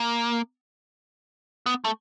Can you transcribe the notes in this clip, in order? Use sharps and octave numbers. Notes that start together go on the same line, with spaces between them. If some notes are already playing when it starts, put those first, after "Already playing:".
Already playing: A#3
B3
A3